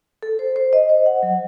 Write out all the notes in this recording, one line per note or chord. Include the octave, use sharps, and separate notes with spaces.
A4
C5
C5
D#5
C5
F#5
F#3